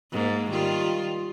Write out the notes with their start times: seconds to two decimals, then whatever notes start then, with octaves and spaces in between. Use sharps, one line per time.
0.11 G#2 A#3
0.50 D#3 G3 F4